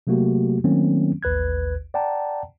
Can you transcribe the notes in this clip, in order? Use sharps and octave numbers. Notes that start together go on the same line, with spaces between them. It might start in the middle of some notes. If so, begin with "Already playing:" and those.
C3 F#3 A3 A#3 F#4 G4
D#3 F#3 A3 A#3 C4 C#4
A1 D#2 B4 F#6 G#6
D5 F#5 G5 A5 A#5